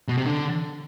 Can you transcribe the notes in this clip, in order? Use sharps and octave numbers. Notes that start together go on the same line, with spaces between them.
B2
C3
D3